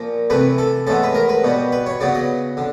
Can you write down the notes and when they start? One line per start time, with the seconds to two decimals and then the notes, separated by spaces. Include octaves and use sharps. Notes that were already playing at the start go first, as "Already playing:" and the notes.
Already playing: A#2 F3 A#3
0.30 C3 E3 A3 B4
0.58 A4
0.87 A2 E3 G#3 B3 A4
1.03 B4
1.15 A#4
1.29 B4
1.44 B2 G3 B3
1.72 B4
1.86 C#5
2.00 C#3 F#3 B3 D5
2.15 D#5
2.57 D3